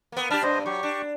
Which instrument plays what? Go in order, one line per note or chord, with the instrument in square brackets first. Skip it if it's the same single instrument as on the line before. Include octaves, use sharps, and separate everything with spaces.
[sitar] A#3 B3
[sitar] D4 G4 [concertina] A5 B5 F6
[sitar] G2 [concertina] C5 D#5
[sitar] F#3 [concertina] G4 C#6
[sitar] D4